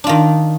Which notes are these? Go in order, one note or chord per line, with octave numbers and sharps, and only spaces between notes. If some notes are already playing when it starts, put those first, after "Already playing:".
D#3 D4 F4